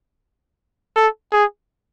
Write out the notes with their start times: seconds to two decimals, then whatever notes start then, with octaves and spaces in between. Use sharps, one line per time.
0.96 A4
1.32 G#4